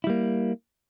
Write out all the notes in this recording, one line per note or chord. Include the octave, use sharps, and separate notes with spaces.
G3 A#3 E4